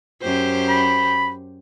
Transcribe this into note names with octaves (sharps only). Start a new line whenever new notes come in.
F#2 G4 C5
B5